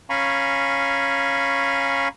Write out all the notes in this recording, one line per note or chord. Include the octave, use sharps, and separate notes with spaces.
C#4 F5 G#5 A#5 B5 C#6